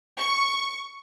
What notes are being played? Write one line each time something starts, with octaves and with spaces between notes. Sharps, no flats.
C#6